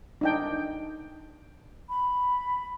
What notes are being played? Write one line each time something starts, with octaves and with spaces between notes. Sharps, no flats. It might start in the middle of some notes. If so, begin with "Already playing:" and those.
D4 D#4 G5
B5